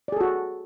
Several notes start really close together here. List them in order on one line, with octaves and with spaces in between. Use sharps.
D5 G#4 A4 F#4